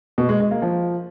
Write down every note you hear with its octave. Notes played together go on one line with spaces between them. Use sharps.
B2
G#3
G#3
A#3
F3